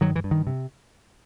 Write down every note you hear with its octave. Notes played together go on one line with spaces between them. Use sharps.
G2 D#3 F#3
E3
G2
D#3
C3